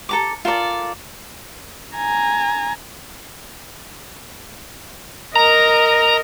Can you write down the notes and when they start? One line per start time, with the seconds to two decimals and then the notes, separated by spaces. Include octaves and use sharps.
0.09 A4 A#5 D6
0.45 F4 A4 A#4 D5
1.96 G#5 A#5
5.36 A#4 D#5 A#5